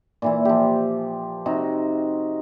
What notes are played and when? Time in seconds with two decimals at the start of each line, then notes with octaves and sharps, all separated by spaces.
0.22 A#2 E3 E4
0.45 F3 G4
1.46 C3 D#4 F#4